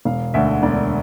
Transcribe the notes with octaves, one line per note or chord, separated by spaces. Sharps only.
E1 F5
D2 D3 E5
E1 D5